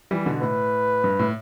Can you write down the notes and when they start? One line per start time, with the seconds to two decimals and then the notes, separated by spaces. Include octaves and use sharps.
0.11 E3 G3
0.26 B2 D3
0.42 A2 B4
1.04 G2
1.19 A2